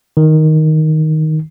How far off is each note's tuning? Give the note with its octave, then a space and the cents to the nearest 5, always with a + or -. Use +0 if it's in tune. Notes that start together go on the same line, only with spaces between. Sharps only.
D#3 +5